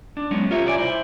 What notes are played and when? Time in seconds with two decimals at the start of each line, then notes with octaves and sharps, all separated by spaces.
0.17 D4
0.31 F#3 G#3 B3 C#4
0.51 F4 G4 A#4 C#5 E5
0.65 C2 E4 D5 G#5
0.78 E4 C5